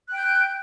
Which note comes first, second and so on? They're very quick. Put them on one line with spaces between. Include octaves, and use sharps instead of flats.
F#6 G5 G6